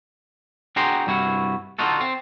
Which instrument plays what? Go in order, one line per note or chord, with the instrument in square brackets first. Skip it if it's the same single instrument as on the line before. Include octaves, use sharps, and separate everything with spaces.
[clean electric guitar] D4 F#4 G#4 G5 A#5 C6
C2 G2 E4 F#4
D3 D#4 F4 F#4 A4
C4